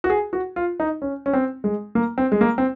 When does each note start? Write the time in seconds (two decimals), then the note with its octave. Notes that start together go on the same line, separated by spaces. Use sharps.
0.04 F#4
0.10 G#4
0.33 F#4
0.56 F4
0.80 D#4
1.02 C#4
1.26 C#4
1.34 C4
1.64 G#3
1.95 A#3
2.18 C4
2.32 G#3
2.41 A#3
2.58 C4